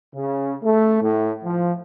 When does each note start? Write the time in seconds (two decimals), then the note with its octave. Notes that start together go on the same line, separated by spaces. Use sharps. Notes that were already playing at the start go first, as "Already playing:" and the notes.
0.14 C#3
0.62 A3
1.01 A2
1.44 F3